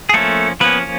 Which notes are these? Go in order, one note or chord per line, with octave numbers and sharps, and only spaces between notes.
G#4
F3 A3 A#3 C#4 A4
F3 A#3 B3 C#4 B4